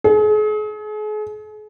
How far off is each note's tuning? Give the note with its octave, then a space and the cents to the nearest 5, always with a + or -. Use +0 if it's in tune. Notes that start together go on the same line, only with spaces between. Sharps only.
G#4 +40